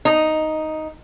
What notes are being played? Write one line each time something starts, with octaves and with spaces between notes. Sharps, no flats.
D#4